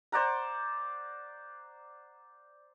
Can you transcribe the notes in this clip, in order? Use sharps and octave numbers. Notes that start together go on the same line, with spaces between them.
C5 D5 F#5 A#5